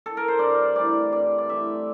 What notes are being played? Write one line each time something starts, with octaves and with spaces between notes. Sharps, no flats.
A4
A#4
C5
G2 D5
E3 A3 C4 D5
G2 D5
D5
E3 A3 C4 E5